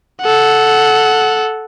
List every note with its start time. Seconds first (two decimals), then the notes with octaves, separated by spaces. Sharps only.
0.21 A4 F#5